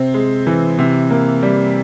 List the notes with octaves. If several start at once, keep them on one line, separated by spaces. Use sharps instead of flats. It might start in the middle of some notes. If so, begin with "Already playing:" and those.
Already playing: C3 C4
G#3
E3
C3
A#3
G3